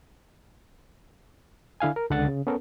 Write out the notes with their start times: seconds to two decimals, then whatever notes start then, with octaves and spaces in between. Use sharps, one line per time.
1.80 D3 E4 F5 G#5
1.96 A#4
2.10 C#2 D3 F#5 A6
2.28 C#3
2.47 B3 C#4 A4 A#4